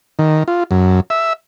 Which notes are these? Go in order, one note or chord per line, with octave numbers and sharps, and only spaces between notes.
D#3
F4
F#2
E5